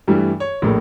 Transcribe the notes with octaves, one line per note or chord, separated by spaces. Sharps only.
G2 E3 G3 A3
C#5
A#1 A2 A#3